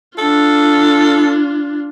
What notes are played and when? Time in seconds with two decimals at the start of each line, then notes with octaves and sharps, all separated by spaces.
0.18 D4 F4 A4